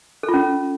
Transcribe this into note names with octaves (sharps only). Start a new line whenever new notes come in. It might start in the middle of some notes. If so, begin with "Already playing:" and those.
A4
F4
C#4